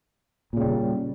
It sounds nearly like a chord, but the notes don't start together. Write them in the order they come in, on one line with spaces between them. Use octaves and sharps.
A#2 C#3 G3